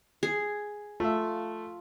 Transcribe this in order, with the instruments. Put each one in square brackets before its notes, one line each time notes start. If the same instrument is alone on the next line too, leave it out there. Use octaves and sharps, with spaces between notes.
[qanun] G#4
[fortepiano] A3 E5 [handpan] F4